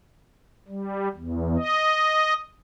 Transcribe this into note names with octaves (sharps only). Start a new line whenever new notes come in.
G3
E2
D#5